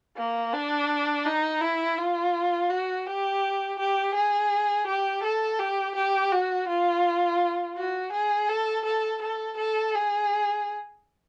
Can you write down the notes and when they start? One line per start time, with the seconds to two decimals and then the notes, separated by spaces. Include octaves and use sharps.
0.17 A#3
0.53 D4
1.26 D#4
1.61 E4
1.98 F4
2.70 F#4
3.07 G4
3.79 G4
4.14 G#4
4.87 G4
5.24 A4
5.59 G4
5.96 G4
6.32 F#4
6.68 F4
7.77 F#4
8.12 G#4
8.49 A4
8.85 A4
9.22 A4
9.57 A4
9.95 G#4